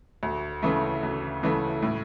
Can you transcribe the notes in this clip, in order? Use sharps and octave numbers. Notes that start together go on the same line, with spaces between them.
D2
C#3 E3 A3
D2
C#3 E3 A3
A2